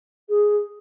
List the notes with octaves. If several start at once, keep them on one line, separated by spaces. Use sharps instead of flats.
G#4